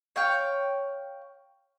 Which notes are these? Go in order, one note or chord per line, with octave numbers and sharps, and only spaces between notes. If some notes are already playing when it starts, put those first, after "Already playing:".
C#5 F5 G5 C#6